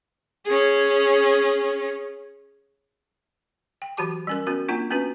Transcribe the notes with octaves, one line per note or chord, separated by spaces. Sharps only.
C#4 G#4
G5
E3 F#3 F#4 G4 A5 D6
G3 C#4 A#4
B3 C#4 F#4 A#4
A#3 C4 D4 F4
B3 C#4 D4 F#4 B4